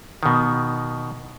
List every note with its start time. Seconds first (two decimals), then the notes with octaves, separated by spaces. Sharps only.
0.23 B2 D#3